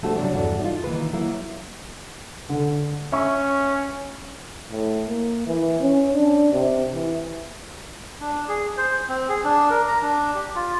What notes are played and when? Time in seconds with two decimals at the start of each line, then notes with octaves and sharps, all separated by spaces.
0.02 F3 A3 D4 F#4 G4 C5
0.18 C#3 F#3 G3 A#3 C#4 D4
0.33 E2 G2 F#4 A4 D5
0.60 D#4 F4
0.84 D#3 E3 A#3 B4
1.13 F#3 A#3 E4
2.49 D3
3.12 C#4 E5 C#6
4.71 A2
5.07 A#3
5.46 E3
5.80 C#4
6.14 D4
6.52 C3
6.94 E3
8.21 D4
8.48 G#4
8.77 C5
9.08 C4
9.29 G#4
9.44 D4
9.70 A#4
9.88 A#5
10.02 D4
10.34 G4
10.55 F4